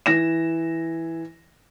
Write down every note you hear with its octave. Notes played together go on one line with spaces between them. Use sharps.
E3 A#6 E7